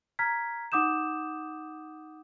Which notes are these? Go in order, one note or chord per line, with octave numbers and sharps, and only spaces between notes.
A#5 F6 G#6 B6
D#4 F#5 D6 D#6 G6 E7